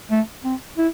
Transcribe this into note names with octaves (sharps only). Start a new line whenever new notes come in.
A3
C4
E4